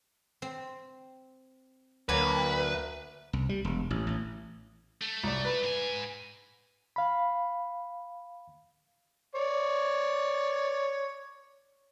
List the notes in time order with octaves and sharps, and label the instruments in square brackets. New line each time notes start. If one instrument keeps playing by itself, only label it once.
[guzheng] C4
[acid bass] D2 [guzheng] F#3 D5 G#5 [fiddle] A#3 [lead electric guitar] B4
[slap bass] C2
G3
E1
A1
A1
[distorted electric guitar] A3
[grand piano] C2 D5
B4
[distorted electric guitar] G#2 G#5
[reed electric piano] F5 B5
[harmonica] C#5 D5